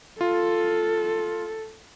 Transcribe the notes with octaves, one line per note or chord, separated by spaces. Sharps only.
F4 A4